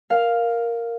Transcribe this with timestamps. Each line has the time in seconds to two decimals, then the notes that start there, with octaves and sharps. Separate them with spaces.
0.10 A#4 F5